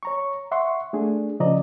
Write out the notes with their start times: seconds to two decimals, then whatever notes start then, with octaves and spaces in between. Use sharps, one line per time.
0.03 C#5 A#5 C#6
0.52 E5 F#5 C6 C#6
0.93 A3 D4 G#4
1.40 C#3 F3 D5 D#5 A#5